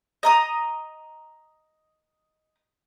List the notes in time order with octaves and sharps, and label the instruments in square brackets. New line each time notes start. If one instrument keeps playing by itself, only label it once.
[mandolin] D#5 A#5 D#6